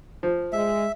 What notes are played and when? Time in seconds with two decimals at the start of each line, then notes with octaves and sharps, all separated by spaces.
0.23 F3
0.52 G#3 E5